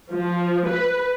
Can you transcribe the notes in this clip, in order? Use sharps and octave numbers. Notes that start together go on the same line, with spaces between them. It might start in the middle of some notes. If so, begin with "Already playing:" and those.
F3
B4